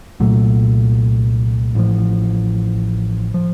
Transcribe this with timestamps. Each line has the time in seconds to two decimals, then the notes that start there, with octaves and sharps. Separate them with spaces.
0.20 C2 A#2 F#3 A3
1.75 A1 A2 F3
3.34 F3